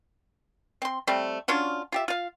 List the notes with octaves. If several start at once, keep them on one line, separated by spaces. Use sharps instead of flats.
C4 C6
G3 A3 C4
C#4 D4 F4 F#4
F4 G4 E5
F4 F5